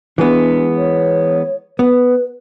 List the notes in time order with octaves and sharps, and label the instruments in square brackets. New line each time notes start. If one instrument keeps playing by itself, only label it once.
[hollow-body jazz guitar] E3 G#3 B3 [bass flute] D4
[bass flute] C#5
[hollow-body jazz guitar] B3 [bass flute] B4